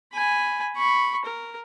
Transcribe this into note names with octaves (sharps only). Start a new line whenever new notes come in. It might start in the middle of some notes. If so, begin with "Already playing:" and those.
G#5 B5
B5 C#6
A#4